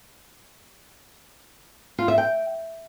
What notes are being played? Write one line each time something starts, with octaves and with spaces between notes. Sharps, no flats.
F4
E5
G5